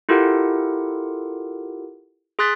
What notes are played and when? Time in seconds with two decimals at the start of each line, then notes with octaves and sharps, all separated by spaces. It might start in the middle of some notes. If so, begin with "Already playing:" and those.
0.09 E4 F4 G4 A4 A#4 F#5
2.39 G#4 C6 D#6 F#6 A6 B6